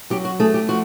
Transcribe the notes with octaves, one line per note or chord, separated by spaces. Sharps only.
F#3 G4
F#4
A3 G#4
G4
F3 F#4